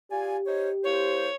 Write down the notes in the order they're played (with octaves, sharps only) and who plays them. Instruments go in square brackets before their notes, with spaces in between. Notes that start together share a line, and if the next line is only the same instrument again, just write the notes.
[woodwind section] F4 D5 G#5 [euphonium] G4
[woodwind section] D#4 C5 C#5
[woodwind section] A#3 E4 C5 [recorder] C#5